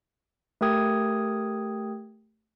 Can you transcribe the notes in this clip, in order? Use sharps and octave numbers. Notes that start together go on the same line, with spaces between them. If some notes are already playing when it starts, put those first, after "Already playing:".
A3 G4 A#4 G5 D#6 G#6